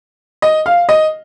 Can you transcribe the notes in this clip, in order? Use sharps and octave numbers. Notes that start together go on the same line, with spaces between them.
D#5
F5
D#5